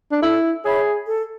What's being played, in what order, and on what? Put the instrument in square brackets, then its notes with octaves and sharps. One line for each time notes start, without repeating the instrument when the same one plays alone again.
[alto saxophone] D4
[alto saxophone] E4 [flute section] A4
[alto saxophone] G#4 [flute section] C#5 E5 B5
[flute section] A4